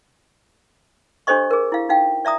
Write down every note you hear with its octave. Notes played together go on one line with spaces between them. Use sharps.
D4 G4 A4 C5 D#5 C#6
G#4 A#4
E4 F5
D#4 F#4 F5 G5
D5 E5 A#5 D#6